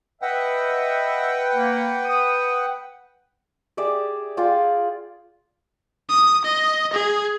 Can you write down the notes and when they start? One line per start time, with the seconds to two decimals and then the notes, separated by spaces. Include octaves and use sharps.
0.22 B4 D#5 E5 F#5 G5
1.55 A#3
2.05 D#6
3.77 G4 G#4 D5 E5
4.37 F4 G#4 D5 G5
6.09 D#6
6.44 D#5
6.93 G#4